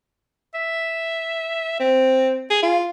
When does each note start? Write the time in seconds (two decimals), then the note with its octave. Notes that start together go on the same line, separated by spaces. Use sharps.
0.55 E5
1.80 C4
2.50 G#4
2.63 F4